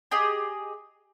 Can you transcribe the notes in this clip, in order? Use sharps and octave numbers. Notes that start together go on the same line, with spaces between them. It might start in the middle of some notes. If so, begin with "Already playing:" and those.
G4 G#4 D#5